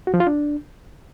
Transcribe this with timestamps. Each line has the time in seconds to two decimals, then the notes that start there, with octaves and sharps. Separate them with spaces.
0.07 F#4
0.14 F3
0.20 F4
0.27 D4